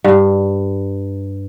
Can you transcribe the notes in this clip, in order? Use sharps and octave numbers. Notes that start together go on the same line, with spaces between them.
G2